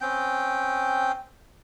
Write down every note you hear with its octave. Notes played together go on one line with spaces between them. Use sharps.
C4 C#4 G5